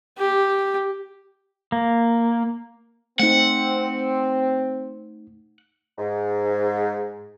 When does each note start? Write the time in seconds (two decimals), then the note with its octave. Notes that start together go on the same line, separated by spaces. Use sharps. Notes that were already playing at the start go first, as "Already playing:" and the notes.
0.18 G4
1.72 A#3
3.20 A3 C4 D#4 F#5
5.98 G#2